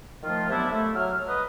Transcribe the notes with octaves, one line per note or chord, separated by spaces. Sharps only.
D#3 F3 A3 F4
C3 F#3 B3 D4 E4
A3 E4
F#3 F6
B4 D#5